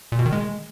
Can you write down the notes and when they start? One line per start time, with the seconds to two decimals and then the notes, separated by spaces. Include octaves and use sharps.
0.12 A#2
0.19 B2
0.26 D#3
0.32 G#3